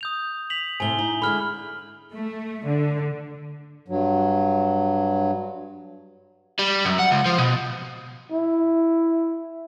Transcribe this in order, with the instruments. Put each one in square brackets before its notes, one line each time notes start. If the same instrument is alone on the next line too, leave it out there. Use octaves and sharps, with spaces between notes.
[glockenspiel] D#6 G6 F7
B6 F7 F#7
[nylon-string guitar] A2 C3 [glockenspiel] G#5 G7
[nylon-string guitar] D#4
[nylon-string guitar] D3 G#3 E4 [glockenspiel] B5 F6
[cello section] A3
D3
[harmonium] G2 F#3
[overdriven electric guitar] G3
F#2
F#5
C#2
F3
B2
[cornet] E4